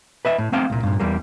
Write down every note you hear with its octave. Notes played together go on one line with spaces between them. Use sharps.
B4 D#5 E5
A2
A3 A#3 C4 F5 G5
C2 A#2
G2 A#2
E2 G3 A#3